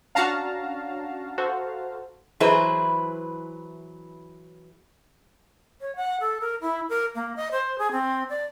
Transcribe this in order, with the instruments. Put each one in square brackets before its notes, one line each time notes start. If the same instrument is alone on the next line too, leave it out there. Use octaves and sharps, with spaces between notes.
[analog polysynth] C#4 D4 F#4 [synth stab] F5 A5 A#5
[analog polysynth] F#4 A4 C5
[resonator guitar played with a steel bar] E3 F#3 E4 G#4 B4 C5
[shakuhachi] C#5
F#5
A4
A#4
E4
A#4
A#3
D#5
C5
G#4
C4
D5